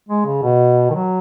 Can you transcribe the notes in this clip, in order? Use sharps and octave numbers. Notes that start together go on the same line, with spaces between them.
G#3
C#3
B2
D#3
F#3